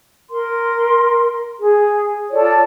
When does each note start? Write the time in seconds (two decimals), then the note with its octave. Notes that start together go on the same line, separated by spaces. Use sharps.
0.29 A#4 C6
1.59 G#4
2.31 F4 A4 C#5 D5